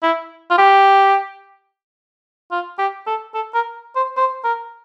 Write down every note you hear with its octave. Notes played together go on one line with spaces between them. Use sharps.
E4
F4
G4
F4
G4
A4
A4
A#4
C5
C5
A#4